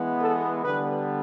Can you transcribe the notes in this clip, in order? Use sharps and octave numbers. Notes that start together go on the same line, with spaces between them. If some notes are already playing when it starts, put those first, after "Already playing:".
Already playing: E3 G#3 B3
A4
D3 G3 B3 B4